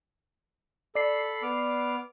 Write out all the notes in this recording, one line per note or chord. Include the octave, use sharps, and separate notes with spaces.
A4 D5 B5 C7
B3 D6 F6